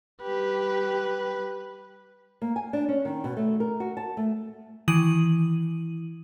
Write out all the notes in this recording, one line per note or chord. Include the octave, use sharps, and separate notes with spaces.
G3 G4 B4
A#3
G#5
D4
C#4
D#3
B2
A3
A#4
F#4
A5
A3
D#3 E3 E4 D#6 D#7 F#7